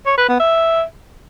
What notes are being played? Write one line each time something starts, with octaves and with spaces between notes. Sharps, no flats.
C#5
B4
B3
E5